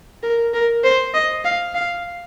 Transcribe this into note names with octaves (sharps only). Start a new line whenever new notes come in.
A#4
A#4
C5
D#5
F5
F5